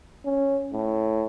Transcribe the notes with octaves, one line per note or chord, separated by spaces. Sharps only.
C#4
A2